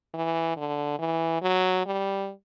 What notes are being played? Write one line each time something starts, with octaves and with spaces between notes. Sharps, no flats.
E3
D3
E3
F#3
G3